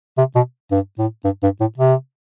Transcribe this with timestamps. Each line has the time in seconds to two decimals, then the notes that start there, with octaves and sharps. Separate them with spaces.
0.18 C3
0.35 B2
0.71 G2
0.98 A2
1.24 G2
1.43 G2
1.60 A2
1.78 C3